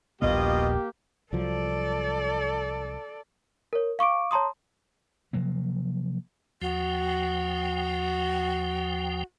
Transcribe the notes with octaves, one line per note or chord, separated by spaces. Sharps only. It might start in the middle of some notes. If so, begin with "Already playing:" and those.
D#1 A#1 B2 A#3 B3 F4 G4 D#5
C2 F3 F#3 A4 D5
A#4 C#5
F5 C#6 D6 D7
C#5 A5 A#5 C6 D#6
C3 F3 F#3 A#3
D#2 F3 F#4 G5